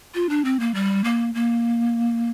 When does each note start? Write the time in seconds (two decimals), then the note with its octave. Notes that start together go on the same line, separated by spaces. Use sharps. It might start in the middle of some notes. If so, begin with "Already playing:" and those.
0.15 F4
0.29 D4
0.45 C4
0.60 A#3
0.75 G3
1.04 A#3
1.35 A#3